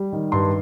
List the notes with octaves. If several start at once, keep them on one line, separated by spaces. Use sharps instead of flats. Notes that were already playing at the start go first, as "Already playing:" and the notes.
Already playing: G3
D#3
G2 C6